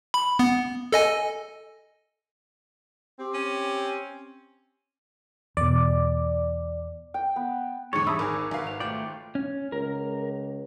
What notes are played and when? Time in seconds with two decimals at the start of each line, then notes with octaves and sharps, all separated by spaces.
0.14 B5
0.39 B3
0.92 A4 D#5 G#5
3.19 C4 G4
3.34 C#4
5.57 E2 B2 D5
7.14 G5
7.36 B3
7.93 E2 G#2 D3 C#5 C#6 A6 C#7
8.07 G3 C4 E5 A5 B5 D#6 E6
8.19 G#1 G#4 A#4 G#5 D6
8.51 G#1 F#4 B4 F5
8.67 F7
8.80 A3 F4 C5 D5 G5
9.35 C#4
9.72 C#2 A#4